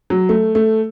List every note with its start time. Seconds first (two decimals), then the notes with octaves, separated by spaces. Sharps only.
0.10 F#3
0.29 A3
0.55 A3